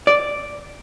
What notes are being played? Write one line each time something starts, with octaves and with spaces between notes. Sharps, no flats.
D5